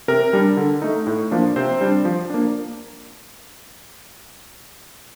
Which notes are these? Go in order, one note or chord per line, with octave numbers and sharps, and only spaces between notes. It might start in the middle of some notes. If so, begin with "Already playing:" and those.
C3 A#4
G3 D4
D3
A3 D#4
A2
F3 A#3 D4
C3 C4 C5
G3 D4
F3
A#3 D4